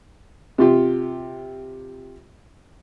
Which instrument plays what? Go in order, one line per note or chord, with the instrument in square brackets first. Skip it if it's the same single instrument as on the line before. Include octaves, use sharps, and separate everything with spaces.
[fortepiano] C3 F4 G4